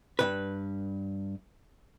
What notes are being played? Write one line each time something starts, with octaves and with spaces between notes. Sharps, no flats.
G2 A#2 B4